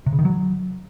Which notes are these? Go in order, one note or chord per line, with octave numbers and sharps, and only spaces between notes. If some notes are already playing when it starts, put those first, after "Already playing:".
C3
C#3
D#3
F#3